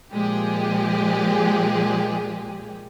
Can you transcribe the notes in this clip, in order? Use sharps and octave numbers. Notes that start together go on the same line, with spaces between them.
A#2 F3 G#3 G4 G#4